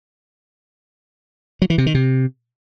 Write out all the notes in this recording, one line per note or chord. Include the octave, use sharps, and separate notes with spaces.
F#3
E3
C3
D#3
C3